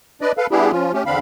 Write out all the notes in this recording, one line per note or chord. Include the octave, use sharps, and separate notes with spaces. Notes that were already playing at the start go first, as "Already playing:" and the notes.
D4 B4 D5 D#5
A4 B4 F5
G3 B3 D4 E4 G4 G#4
F3 C#4 F4
A3 C#4 G4
E2 D3 C4 D4 F5 B5